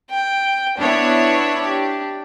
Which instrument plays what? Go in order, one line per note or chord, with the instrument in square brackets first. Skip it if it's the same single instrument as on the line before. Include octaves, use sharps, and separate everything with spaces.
[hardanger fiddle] G5
[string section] B3 E4 C#5 [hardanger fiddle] D4
[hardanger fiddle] D4 G4